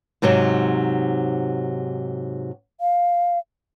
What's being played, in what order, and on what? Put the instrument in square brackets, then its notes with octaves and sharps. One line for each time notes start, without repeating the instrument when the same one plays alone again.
[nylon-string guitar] G#2 C3 F#3 C4 D#4
[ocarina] F5